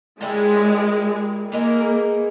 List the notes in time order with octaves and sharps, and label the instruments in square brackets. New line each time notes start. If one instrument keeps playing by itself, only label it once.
[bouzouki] A#2 G3 C#4 E4 [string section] G#3
[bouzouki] E3 G#3 D#4 G#4 [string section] A#3